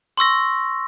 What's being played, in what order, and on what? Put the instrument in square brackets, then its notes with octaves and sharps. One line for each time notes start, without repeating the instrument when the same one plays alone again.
[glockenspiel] C6 C#6 E6 A#6